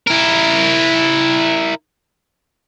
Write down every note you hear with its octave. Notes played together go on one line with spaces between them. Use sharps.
E4 A#4